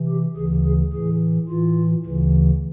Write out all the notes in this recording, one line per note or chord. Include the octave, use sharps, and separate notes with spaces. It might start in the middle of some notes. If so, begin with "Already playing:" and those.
Already playing: C3 E3
G4
D2 C#3 E3 G#4
G#4
A2 E3 G#4
A2 E3 F4
D2 C#3 E3